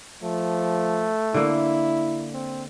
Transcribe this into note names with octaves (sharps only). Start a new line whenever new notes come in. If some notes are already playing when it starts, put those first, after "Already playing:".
F3 A3
D3 A#3 E4
C4